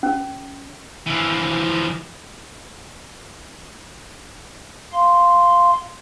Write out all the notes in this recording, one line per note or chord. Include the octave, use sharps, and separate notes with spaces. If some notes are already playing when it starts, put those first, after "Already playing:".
C#4
E3 F3
F5 C6